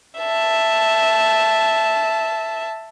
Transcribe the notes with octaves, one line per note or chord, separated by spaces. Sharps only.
E5 A5